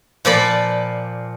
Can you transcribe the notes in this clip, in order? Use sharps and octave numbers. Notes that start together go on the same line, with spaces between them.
A#2 F3 D5 B5